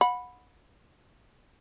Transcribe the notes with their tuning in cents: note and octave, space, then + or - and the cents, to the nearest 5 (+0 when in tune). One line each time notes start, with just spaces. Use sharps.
F#5 -25 B5 +0